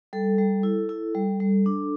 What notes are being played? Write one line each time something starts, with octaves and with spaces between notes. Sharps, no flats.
G3 A4
G3
E4
E4
G3
G3
D4